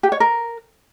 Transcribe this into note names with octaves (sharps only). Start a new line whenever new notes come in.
G4
C#5
A#4